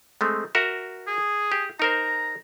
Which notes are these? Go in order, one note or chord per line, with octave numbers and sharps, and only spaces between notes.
G#3 A3 C4
F#4 A#4 E5
G#4
G4
D#4 A#4 C5 A#5